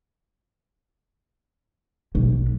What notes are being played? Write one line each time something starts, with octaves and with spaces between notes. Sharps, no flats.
B1